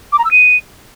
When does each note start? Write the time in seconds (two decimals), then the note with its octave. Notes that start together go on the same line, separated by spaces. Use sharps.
0.12 D6
0.18 A#5
0.24 E6
0.31 D#7